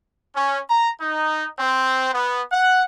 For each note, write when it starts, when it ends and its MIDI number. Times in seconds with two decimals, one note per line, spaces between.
0.35 0.58 61
0.69 0.89 82
1.01 1.47 63
1.57 2.09 60
2.14 2.42 59
2.51 2.83 78